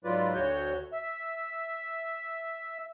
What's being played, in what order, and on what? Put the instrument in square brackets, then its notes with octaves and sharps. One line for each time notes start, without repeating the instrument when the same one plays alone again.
[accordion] G#2 F#3 F4 B4 D5
D2 F#4 C#5 G6
E5